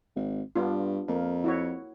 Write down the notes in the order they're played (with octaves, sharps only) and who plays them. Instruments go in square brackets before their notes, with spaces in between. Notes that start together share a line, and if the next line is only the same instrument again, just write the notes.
[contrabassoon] G#1
[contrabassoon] G2 [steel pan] B3 D4 F4
[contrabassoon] F2 [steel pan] A#3
[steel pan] E4 F#4 C#5